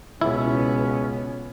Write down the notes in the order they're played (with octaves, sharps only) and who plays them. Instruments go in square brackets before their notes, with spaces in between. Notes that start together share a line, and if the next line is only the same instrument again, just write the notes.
[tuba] C#2 [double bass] B2 B3 [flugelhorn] C#4 [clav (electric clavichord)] E4